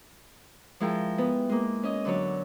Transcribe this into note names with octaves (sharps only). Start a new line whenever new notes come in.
F3 G#3 E4 A#4 G5
B3
G#3 A#3
C#4 D#5
D3 F#3 C#5